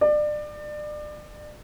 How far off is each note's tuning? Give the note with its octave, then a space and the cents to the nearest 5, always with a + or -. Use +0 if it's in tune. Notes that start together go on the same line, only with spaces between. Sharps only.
D5 +30